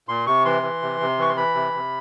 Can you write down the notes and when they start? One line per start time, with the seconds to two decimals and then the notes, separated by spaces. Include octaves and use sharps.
0.08 A#2 C6
0.26 C3 C#6
0.45 E3 C6
0.63 E3
0.82 C3
1.00 C3
1.18 E3 C#6
1.29 C6
1.36 E3 B5
1.55 C3
1.74 C3